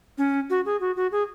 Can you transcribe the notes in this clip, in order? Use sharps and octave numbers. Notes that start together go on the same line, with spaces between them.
C#4
F#4
G#4
F#4
F#4
G#4